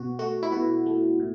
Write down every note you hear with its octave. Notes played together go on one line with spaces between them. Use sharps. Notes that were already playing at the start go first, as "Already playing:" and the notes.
Already playing: B2 F#4
A3 F#4
E4
B2 F#4
A3
A2